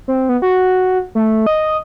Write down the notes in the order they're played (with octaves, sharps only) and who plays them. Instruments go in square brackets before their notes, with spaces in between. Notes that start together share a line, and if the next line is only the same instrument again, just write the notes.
[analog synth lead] C4
B3
F#4
A3
D#5